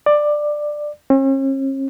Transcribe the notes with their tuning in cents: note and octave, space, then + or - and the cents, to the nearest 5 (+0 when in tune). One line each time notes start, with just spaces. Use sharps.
D5 +15
C#4 -45